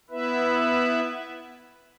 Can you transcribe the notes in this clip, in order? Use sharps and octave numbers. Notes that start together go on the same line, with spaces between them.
B3 E4 B4 E5